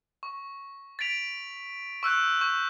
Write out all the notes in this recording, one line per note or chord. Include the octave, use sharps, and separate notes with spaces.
C#6
A6 B6 D7 F7
C#6 E6 F#6 G6
C#6 G6